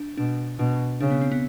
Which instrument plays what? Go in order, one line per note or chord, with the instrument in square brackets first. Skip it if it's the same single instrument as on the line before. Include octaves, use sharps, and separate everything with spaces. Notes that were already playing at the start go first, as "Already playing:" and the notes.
Already playing: [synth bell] D4
[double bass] B2 [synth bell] D4
[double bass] B2 [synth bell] D4
[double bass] C#3 [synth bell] D4
[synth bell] B3
C4
B3